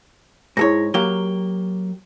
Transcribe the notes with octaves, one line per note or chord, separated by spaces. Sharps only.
G#2 E4 G#4 A4 C#5 A#6
F#3 A#3 G4 G7